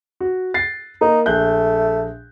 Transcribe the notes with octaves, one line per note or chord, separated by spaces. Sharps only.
F#4
A6 C7
A#3 D#4
A#1 A3 F#6 G6